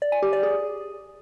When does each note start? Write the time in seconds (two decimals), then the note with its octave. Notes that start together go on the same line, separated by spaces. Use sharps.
0.02 D5
0.12 G#5
0.22 G4
0.33 D5
0.43 G#4